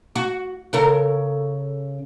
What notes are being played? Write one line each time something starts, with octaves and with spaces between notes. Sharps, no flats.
F#4
C#3 A4 A#4